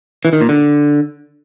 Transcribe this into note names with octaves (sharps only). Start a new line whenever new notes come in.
E3
D#3
A#2
D3